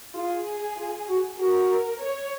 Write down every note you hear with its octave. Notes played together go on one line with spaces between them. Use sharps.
F4 G#4
F4
F#4
F#4 A#4
C#5